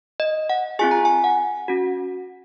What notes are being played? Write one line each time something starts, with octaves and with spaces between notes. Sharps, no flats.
D#5
F#5
C4 F4 G#4 G#5
A#5
G#5
F#5
C#4 F#4